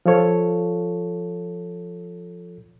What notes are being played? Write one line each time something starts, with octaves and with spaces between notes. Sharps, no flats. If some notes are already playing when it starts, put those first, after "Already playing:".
F3 F4 A4 C#5